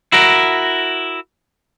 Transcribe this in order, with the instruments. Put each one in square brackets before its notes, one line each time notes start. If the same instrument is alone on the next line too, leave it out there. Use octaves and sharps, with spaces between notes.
[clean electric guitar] E4 F#4 A#4